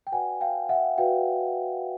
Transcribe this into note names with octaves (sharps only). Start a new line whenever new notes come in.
G5
F#4 B4 D5 F#5 G#5
F5 G5
E5 F#5
F#4 B4 D5 F5 G5